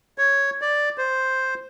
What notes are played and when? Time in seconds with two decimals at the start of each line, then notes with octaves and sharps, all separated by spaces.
0.18 C#5
0.62 D5
0.98 C5